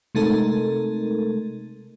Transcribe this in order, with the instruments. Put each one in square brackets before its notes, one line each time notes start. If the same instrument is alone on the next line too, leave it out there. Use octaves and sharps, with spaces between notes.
[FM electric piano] C3 G#3 A3 D#4 A4 A#4